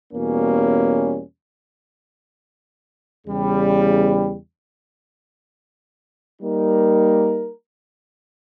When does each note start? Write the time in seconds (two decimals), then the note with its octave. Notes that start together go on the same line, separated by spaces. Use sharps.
0.13 E2 B2 G3 A#3 C#4
3.26 E2 C#3 G3
6.41 G3 A#3 D#4 A#4